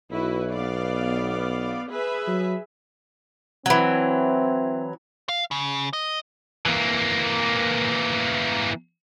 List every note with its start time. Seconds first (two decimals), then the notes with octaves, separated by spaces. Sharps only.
0.11 B1 E4 F#4 B4
0.51 B3 D5 F5
1.91 G#4 B4 E5
2.27 F#3
3.66 E3 F#3 C4
5.29 F5
5.51 C#3
5.93 D#5
6.66 E3 A#3